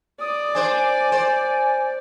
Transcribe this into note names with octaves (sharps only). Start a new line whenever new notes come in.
D5 D#6
D4 C5 G#5
C5